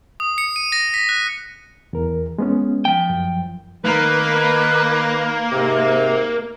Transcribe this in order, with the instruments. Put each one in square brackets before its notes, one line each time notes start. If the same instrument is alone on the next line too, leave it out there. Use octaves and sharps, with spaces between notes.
[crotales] D#6
C#7
D#7
A#6
B6
F#6
[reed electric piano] E2 A#4
G#3 B3 C#4
[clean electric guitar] F3 G5
[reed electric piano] F#2
[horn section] D#3 B4 [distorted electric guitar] A#3
[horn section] G#2 C3